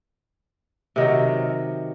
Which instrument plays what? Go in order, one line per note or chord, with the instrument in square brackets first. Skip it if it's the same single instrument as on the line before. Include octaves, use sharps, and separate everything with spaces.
[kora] C3 D#3 F#3